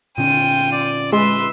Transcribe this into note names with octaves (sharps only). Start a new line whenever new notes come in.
A#2 D3 C#4 F4 G5 D#7
D5
G#3 B4 E5 C6